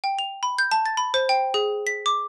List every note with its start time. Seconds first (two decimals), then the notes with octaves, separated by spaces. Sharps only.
0.04 G5
0.19 F7
0.43 B5
0.59 G6
0.71 A5
0.86 A6
0.97 B5
1.14 C5
1.29 G5
1.54 G#4
1.87 B6
2.06 D6